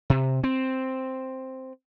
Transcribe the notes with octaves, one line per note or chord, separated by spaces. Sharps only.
C3
C4